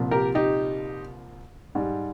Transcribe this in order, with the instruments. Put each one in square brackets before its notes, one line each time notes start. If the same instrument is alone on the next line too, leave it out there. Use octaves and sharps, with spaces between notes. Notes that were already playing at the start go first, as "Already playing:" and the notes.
Already playing: [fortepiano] C2 A#2 F3
G4 A#4
D#4 G4
G#2 G3